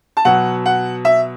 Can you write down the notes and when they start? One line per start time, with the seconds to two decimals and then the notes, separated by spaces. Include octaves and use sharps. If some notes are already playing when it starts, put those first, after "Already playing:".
0.17 A5
0.25 B2 F#3 F#5
0.66 F#5
1.05 E5